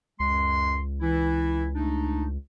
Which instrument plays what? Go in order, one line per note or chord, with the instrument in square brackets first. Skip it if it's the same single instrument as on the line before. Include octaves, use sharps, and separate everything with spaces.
[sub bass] C#2 [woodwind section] F#2 G#3 C6
[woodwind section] E3 E4
A3 D4 D#4